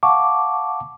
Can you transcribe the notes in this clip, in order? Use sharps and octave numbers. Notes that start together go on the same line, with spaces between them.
F5 F#5 A5 C#6 D6